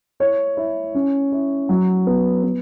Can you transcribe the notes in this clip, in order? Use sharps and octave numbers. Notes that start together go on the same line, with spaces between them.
E4 C#5
E4
C#4
E4
F#3
B3
B3